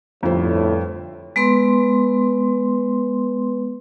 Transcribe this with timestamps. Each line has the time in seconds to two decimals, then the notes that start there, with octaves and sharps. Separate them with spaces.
0.23 G1 F2 A2 C5
1.36 G#3 B3 B4 C6